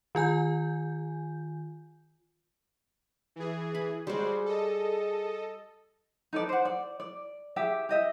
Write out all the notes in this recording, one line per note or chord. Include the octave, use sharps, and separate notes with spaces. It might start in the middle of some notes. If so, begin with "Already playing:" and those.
D#3 F4 G#5 G6
E3 G#4
B5
G3 G#3 F#4 G#4 C5 D5
A4 D#5
D#4 A4 B4 D5
C5 F#5
D5
D5
G4 G#4 E5
G4 D#5 E5